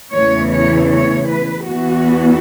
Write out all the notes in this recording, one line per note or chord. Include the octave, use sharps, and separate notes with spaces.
E2 C#3 E3 A3 C#5
C#5
C#5
B4
E2 E3 B3 F#4